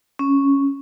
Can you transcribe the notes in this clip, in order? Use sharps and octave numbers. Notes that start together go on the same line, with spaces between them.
C#4